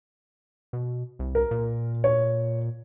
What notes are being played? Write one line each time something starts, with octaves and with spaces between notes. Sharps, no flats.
B2
C2
A#4
A#2
C#5